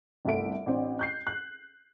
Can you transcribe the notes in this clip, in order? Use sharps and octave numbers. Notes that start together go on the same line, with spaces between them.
G1 C2 A3 E5 D7
A1 C4 D4
F#6 G6 C7
F#6